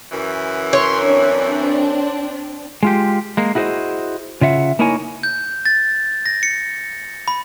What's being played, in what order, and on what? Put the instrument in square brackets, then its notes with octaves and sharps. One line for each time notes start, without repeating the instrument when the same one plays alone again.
[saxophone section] F#2 E3
[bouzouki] C#5 [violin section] C6
[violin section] C4 D4
[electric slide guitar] G#3 F4 G4
G#3 A#3
E4 F#4 G#4 B4 C5 D#5
C#3 F4 E5 F#5
A#3 D#4 E4 A#4 C#5 G#5
[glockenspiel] G6
A6
A#6
C#7
B5